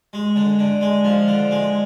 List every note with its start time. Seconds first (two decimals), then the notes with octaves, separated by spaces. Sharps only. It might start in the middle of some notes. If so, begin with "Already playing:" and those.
0.13 G#3
0.36 D3
0.59 D3
0.81 G#3
1.04 F3
1.28 D3
1.51 G#3